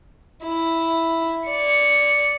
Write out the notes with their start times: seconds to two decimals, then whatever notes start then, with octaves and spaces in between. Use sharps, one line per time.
0.46 E4
1.48 D5 C#7